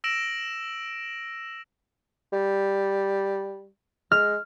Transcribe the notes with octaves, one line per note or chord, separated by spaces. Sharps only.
E6 A#6 D7 E7 F#7
G3
G#3 F6